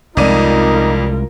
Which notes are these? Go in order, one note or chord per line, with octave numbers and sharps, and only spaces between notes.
C2 F2 G#3 D#4 F4 A#4 D5 D#7